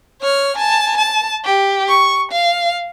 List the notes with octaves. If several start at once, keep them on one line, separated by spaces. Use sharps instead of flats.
C#5 F6
G#5 A5
A5
G4
C#6
F5